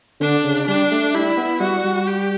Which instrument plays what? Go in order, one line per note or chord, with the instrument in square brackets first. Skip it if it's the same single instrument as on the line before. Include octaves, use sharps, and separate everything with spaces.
[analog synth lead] D3 [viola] D4
[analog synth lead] C#3
[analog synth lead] G3 [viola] D4
[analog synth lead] A3
[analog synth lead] G3 [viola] E4
[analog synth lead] B3
[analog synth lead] G3 [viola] F#4
[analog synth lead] G3
[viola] G4